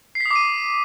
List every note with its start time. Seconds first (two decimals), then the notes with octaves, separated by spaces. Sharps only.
0.15 C7
0.20 B6
0.25 D#6
0.31 D6
0.36 D#7